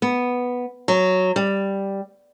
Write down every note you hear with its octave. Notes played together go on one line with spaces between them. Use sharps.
B3
F#3
G3